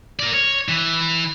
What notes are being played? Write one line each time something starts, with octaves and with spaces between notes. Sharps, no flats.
A#4 D5
C#5
E3